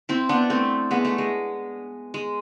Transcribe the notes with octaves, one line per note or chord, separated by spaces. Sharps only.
C4 E4
B3 D4
A3 C4
G#3 B3
A3
G#3
G#3